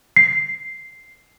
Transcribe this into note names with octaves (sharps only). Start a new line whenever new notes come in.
C7